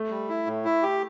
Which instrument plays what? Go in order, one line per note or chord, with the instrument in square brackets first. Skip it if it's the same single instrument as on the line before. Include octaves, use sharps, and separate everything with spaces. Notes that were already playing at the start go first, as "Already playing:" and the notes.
Already playing: [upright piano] A3
[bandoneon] G3
E4
A2
E4
G4